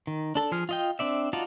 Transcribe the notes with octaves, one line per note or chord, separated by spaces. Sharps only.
D#3
D4 A4 A5
F3 G#4 F6
F4 D#5 G5
C4 D4 D5 E5
D#4 F4 F#4 D5 A5